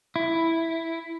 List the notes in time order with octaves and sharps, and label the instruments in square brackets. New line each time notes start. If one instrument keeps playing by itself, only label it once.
[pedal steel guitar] E4